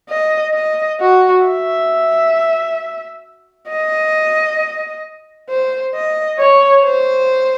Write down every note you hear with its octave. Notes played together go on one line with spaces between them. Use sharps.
D#5
D#5
F#4
E5
D#5
C5
D#5
C#5
C5